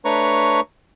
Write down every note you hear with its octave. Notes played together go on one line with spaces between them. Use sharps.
A3 D4 B4 C#5 A#5 C#6